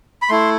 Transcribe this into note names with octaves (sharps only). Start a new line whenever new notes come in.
B5
A3 E4 C6